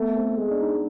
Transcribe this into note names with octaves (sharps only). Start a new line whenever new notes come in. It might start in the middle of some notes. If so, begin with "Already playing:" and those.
Already playing: A3 B3
C4
G#3
D4
D#4